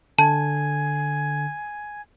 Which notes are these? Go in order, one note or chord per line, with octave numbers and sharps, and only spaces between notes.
D3 G#5 A5